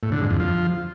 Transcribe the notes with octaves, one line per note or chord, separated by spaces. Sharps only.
A2
D3
G#2
F2
F3